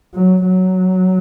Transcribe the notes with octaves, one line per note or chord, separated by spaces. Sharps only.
F#3
F#3